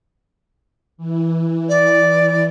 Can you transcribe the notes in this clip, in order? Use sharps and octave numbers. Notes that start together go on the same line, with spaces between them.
E3
D5